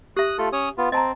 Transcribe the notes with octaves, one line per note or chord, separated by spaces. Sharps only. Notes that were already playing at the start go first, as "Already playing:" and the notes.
G4 E5 D#6 F#6
A3 F4 A4
C#4 C#5 D#6
B3 F4
C4 D#5 A5 A#5